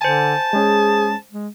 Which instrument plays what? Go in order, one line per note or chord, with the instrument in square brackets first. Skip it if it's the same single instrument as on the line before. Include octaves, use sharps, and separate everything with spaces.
[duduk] D3 [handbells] C5 G#5 [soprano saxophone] A5
[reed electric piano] G#3 C#4 [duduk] G#4
[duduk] G#3